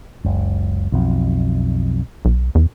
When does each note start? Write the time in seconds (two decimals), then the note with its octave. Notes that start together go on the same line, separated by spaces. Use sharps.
0.24 F#1 C#2
0.92 B1 F2
2.25 B1
2.55 E2